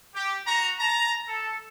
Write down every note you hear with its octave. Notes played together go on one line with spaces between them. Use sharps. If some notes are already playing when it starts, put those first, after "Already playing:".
G4
F#4 A#5
A5 A#5
A4